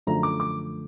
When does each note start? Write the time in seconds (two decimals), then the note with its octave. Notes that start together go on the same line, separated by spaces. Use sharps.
0.07 F#2 D3 F3 A3 A#5
0.23 D6
0.40 D6